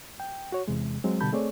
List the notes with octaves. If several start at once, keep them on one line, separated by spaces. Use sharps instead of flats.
G5
F#4 C#5
E2 C3 G#3
F#3 G#3 C4
B2 D3 G3 A5 B5 G6
A3 C4 G#4 C#5 D5